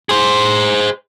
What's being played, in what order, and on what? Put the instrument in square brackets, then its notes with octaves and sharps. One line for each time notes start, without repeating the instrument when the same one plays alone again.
[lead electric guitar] G#4 C5